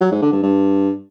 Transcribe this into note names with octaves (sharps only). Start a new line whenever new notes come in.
F#3
G#2
D3
G2
G2